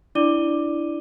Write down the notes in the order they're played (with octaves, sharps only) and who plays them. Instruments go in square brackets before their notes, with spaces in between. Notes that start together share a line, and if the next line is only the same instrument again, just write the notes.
[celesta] D4 E4 D5 D6 D#7 G7